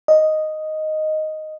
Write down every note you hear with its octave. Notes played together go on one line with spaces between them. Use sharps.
D#5